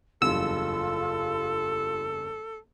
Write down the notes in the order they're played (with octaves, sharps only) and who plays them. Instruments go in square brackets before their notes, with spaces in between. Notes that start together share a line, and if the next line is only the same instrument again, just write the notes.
[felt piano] F#1 E2 G2 [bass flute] F4 [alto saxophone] A4 [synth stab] E6